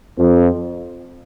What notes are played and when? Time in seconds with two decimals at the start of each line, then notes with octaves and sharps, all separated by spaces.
0.18 F2